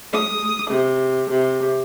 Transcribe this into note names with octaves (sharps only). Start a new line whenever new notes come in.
D#6
C3
C3